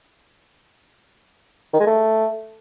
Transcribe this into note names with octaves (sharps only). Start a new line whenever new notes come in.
D#3
G#3
A3